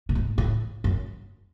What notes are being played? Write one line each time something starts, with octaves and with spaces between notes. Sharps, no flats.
A2
G#2
A2
F#2